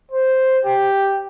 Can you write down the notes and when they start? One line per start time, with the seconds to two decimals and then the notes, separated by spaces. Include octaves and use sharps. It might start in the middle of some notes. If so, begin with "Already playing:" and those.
0.12 C5
0.65 G4